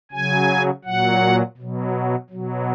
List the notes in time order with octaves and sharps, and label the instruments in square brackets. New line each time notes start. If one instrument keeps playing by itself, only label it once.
[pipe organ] C#3 F#3 G#5
A#2 F#3 F#5
B2 F#3
B2 F#3